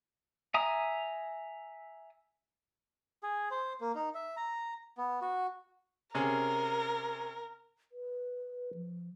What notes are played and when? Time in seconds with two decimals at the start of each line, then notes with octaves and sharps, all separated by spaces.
0.54 E5 G#5 A#5 D#6
3.23 G#4
3.51 C5
3.81 A#3
3.95 D#4
4.15 E5
4.37 A#5
4.97 B3
5.22 F#4
6.14 C3 C#4 G#4 A#4
7.92 B4
8.74 F3